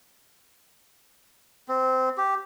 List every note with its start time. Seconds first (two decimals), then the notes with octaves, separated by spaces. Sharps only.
1.68 C4
2.17 G4